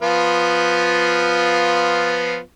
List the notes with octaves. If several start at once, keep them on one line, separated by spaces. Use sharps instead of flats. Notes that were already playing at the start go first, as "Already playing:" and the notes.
F3 B3 F4